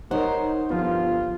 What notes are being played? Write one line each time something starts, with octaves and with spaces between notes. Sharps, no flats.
D#4 A#4 C5 C#5 F#5
G1 F3 B3 F4